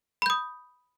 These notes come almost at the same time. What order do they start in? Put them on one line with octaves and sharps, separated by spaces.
B5 G6 D#6